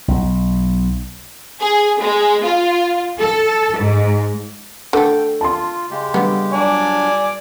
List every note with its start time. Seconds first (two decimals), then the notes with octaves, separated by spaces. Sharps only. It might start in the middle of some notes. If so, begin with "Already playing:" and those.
0.08 B1
1.60 G#4
2.01 G#3
2.43 F4
3.20 A4
3.77 G#2
4.93 D3 A3 A4 G5
5.41 F4 A5 C6
5.91 C#3 G#3 G4
6.14 D3 G3 B3
6.53 F#3 D4 D5 G#5